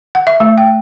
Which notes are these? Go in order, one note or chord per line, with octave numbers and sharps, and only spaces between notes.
F#5
E5
A3
G5